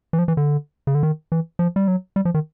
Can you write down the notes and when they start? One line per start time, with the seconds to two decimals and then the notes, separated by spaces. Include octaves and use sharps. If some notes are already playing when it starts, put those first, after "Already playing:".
0.13 E3
0.19 F3
0.28 E3
0.37 D3
0.87 C#3
0.95 D3
1.03 D#3
1.32 E3
1.59 F3
1.76 G3
1.88 F#3
2.16 G3
2.25 F3
2.34 D#3